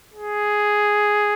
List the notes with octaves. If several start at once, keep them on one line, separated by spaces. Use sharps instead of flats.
G#4